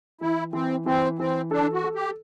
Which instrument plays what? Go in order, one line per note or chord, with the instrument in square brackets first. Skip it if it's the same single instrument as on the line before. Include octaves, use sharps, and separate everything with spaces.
[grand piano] E3 [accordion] E4
[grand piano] E3 [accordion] C4
[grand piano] E3 [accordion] C4
[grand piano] E3 [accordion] C4
[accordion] D4 [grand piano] A4
[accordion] F#4
[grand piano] A4
[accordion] G4